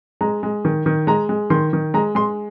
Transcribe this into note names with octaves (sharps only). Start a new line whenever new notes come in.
G#3 A#5
G#3
D#3
D#3
G#3 A#5
G#3
D#3 C6
D#3
G#3 A#5
G#3 C6